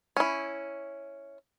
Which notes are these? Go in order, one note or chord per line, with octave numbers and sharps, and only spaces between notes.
C#4 E4